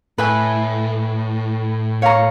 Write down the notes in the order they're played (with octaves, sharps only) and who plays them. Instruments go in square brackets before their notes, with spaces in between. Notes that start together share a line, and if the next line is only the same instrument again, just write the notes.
[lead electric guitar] A2 [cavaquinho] B4 E5 G#5
[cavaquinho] C#5 F5 A#5 C#6